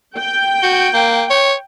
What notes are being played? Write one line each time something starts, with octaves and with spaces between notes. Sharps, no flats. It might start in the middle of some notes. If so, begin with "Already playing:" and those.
G5
F#4
A#3
C#5